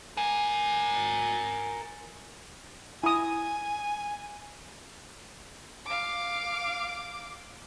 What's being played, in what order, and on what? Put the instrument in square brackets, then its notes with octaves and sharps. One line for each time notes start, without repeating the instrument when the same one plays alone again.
[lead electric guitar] A#4 G#5
[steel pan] E4 D#6 [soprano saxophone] G#5
[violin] F5 D6